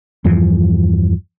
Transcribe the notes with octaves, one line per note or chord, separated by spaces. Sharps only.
E2 G2 E3 F3